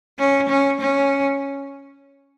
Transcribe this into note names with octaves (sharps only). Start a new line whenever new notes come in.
C#4
C#4
C#4